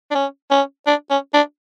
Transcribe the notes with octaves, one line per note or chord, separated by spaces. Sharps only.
D4
C#4
C#4
D4
C#4
D4